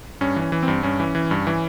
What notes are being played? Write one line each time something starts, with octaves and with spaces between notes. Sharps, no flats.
G2 C#4
E3
C#4
E3
C4
G2
G2 C#4
E3
E3
G2
E3